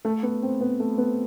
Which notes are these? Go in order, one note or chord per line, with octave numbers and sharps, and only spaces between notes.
A3
B3
C4
B3
A3
B3